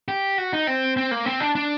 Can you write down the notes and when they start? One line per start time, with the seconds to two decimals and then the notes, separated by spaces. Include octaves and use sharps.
0.08 G4
0.38 F#4
0.53 D#4
0.67 C4
0.97 C4
1.11 A#3
1.25 C4
1.40 D4
1.55 D4